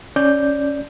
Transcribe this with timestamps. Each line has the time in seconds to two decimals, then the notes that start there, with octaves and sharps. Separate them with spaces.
0.16 C#4 D5 G6